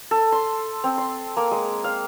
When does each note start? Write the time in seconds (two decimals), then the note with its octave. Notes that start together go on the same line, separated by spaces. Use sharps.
0.11 A4
0.32 C6
0.84 C4
0.98 C6
1.37 A#3
1.51 G#3
1.84 F5